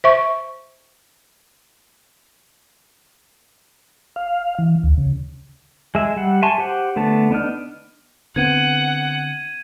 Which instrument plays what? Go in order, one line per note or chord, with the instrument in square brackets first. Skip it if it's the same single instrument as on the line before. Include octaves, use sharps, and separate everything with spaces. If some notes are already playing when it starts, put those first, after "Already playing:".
[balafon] C5 E5 C#6
[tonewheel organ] F5
E3
D2
C#3
[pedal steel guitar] G#3 E5
G3 F#5
E5 G#5 A5 C6 C#6
G4 C5 F#5
D3 A3 B3 A5
B3 D4 D#4 F6
[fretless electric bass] D3 B3 C4 [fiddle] F#5 [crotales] G#6 D#7